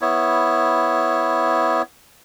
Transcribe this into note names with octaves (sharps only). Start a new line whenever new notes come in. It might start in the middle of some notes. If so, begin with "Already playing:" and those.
B3 E4 C#5